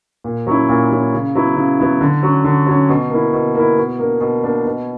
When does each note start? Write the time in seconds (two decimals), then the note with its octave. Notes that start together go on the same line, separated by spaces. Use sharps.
0.24 A#2
0.47 F#3 C#4 E4
0.69 A#2
0.91 F#3 C#4 E4
1.13 C#3
1.35 F#3 B3 E4
1.56 C#3
1.79 F#3 B3 E4
2.01 D3
2.23 F#3 C#4
2.44 D3
2.67 F#3 C#4
2.89 B2
3.11 A#3 E4
3.33 B2
3.55 A#3 E4
3.78 B2
3.99 A#3 D4
4.21 B2
4.43 A#3 D4
4.66 B2